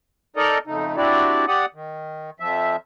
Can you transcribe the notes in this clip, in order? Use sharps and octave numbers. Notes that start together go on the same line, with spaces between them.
D#4 A4 A#4 D5 D#5 A#5
F2 C#3 A3 D#4
C4 D4 E4 F#4 G4 D5
G4 D5 F#5 D#6
D#3
F2 F3 E5